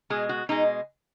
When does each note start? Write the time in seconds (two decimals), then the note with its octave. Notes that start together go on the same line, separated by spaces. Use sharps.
0.10 B2 G#3 G#4
0.29 F#4
0.49 B2 G#3 D#4